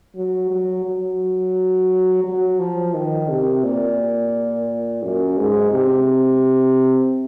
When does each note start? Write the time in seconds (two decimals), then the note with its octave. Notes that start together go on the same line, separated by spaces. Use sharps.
0.16 F#3
0.50 F#3
0.85 F#3
2.24 F#3
2.60 F3
2.94 D#3
3.29 C3
3.64 A#2
5.03 F#2
5.38 G#2
5.72 C3